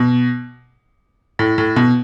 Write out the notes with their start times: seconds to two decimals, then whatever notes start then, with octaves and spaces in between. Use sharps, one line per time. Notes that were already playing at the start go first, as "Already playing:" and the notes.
Already playing: B2
1.39 A2
1.58 A2
1.76 B2